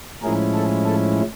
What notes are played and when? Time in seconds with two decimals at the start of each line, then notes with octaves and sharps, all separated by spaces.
0.23 A2 F3 G#3 C#4 E4 G#4 A#4
0.54 A4
0.85 A4